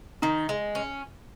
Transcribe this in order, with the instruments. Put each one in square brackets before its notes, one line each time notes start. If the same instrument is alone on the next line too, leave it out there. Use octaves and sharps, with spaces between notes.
[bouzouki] D#3 [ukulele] D#4
[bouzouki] G#3
C#4